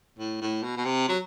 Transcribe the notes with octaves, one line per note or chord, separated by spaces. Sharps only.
A2
A2
B2
B2
C3
F#3